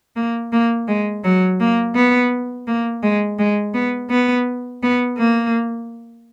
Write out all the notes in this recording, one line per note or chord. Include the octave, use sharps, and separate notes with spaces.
A#3
A#3
G#3
F#3
A#3
B3
A#3
G#3
G#3
B3
B3
B3
A#3